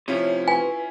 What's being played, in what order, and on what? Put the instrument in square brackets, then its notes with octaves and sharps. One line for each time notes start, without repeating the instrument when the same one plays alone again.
[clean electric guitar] C3 F3 [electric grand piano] C#4 E4 F4 [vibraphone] C#5
[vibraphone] B4 [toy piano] G#5